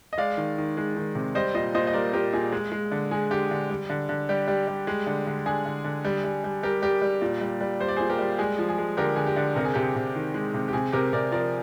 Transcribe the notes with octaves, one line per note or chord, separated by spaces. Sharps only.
D#5
G#3 D5 F5
D#3
D#3
G#3
D#3
C3
G3 C5 D#5
A#2 C5 D#5
A#2 C5 D#5
D#5
G3 A#4 D5
A#2 G4 A#4
A#2 G#4
G#3
G#3
D3
G#3 G#4
D3 G4
D3
G3
D3
D3
G3 G4
G3
G3
G#3
D3
D3
D3 G#4
D3
D3
G3
G3
G3
G3 G4 A#4
G3 G4 A#4
G3
A#2
G3
G3
G3 C5
D5
A#2 G#4 C5
G4 A#4
G3
G#3 G#4
F3
G#4
G#3
D3 G4 A#4
D3 G#4
G4
D3
C3 A#4
G#4
C3 G4
G#4
C3
D#3
G#3
C3
G4
C3 G#4
C3 G4 A#4
C3 A#4 D5
F3 A#4 D5